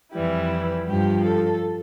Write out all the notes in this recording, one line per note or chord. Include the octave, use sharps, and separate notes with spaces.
F2 E3 G3 E4
G2 F3 G4
A4